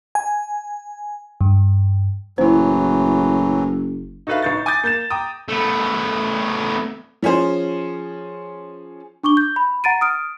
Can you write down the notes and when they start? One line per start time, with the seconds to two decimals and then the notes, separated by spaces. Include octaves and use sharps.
0.15 G#5
1.41 G2
2.38 F#1 A2 E3 F#3 E4 C5
4.27 D#4 F#4 A4 B4 E5 F5
4.42 A1 D#4 C#6 G6 A6
4.66 G#5 D6 D#6 G6 A6
4.84 A#3 G6 A6 E7
5.11 G5 A#5 D6 D#6
5.48 A3 B3
7.23 F3 C#4 G#4 C5
9.24 D4 C#6 D6 G7
9.37 G6
9.56 B5
9.84 F#5 A#5 A6 D7 D#7
10.01 D#6 F6 D7